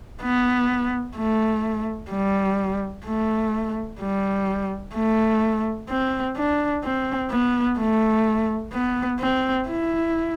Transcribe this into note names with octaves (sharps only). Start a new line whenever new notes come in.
B3
A3
G3
A3
G3
A3
C4
D4
C4
B3
A3
B3
C4
E4